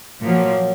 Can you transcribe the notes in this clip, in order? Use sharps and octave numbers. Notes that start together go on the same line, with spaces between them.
A#2 F3 F#3 A#3